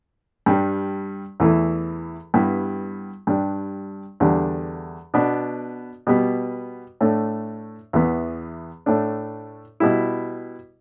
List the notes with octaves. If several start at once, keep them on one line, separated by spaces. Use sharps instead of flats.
G2 G3 D4
E2 E3 A3 E4
G2 G3 B3 E4
G2 G3 D4
E2 D3 G3 D4
B2 B3 D4
B2 G3 B3
A2 A3 D4
E2 E3 B3
A2 A3 D4
B2 G3 E4